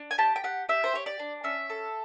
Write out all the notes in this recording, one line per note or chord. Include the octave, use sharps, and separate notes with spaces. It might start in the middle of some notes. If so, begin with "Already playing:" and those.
Already playing: D4
G#5
G4 A5
G5
G4 F#5
G4 E5
C5
G4 C#5
D5
D4
C#4 E5
A4